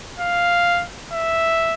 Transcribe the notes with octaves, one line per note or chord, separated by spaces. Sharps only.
F5
E5